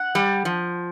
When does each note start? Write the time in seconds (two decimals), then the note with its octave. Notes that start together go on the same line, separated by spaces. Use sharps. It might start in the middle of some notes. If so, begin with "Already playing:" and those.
Already playing: F#5
0.15 G3
0.45 F3